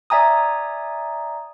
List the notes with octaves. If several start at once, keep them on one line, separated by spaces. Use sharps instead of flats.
D5 E5 G#5 A#5 D#6